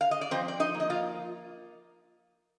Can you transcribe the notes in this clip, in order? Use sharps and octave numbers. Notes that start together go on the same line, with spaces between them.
F5
D#5
D5
F3 C4 C5
D5
D#4 D#5
A#3
D#5
F4 F5